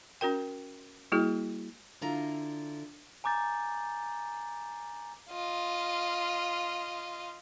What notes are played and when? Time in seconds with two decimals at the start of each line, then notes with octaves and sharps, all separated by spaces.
0.21 C#4 F#4 A#4 G5
1.12 G3 A#3 E4 F#4 G#4
2.01 D3 E4 F4 A#5
3.24 G#5 A#5 D6 G6 A6
5.30 F4 D#5